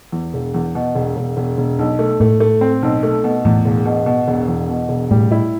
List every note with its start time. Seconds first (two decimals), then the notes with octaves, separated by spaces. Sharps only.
0.12 E2
0.34 E1
0.54 E2
0.75 B2
0.95 E1
1.17 E1
1.37 E1
1.58 E1
1.79 B1
1.99 A3
2.20 A2 A3
2.40 A3
2.61 C4
2.83 B1
3.03 A3
3.24 B2
3.45 E2 A2
3.66 E1
3.85 B2
4.06 B2
4.28 E1
4.48 E2
4.69 B2
4.89 E1
5.11 A2 G3
5.31 E4